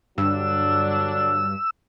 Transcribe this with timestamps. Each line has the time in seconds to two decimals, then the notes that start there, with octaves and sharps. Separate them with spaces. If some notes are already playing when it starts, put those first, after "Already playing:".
0.18 G2 D3 F#3 D4 E6